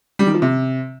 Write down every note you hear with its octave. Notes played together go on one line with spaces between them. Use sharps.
G3
D#3
F3
C3